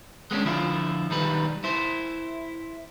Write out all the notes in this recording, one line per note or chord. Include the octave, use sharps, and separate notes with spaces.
G#3 B3 C#4 D4
D3 F3 E4 F4
B1 D#3 G3 B4
E4 C5